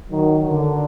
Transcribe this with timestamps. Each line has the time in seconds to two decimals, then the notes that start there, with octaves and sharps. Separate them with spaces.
0.11 D#3 F#3
0.49 D3